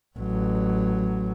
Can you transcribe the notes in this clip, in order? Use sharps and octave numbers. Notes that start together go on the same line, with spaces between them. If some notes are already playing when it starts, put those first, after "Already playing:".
A1 F#3